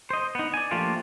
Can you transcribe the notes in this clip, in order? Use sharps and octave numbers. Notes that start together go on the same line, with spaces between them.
C5 D#5
B3 D#4
D5 G#5
F3 A3 A#3 D4 F4 G4